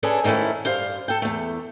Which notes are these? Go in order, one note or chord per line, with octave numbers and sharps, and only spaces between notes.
C#4 D4 G#4 A4 B4
G#2 D#3 A3 C#4 E4
G2 C5 F5
A4 G5
E2 A3